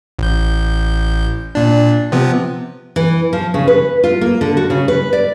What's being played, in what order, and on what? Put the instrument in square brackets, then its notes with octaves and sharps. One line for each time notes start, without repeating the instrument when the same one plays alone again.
[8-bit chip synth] A1 G6
A#2 D4
C3 F3 B3
[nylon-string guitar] E3
F3
C#3
B4
F4
A#3
D3
F#4
C#3
B4
D5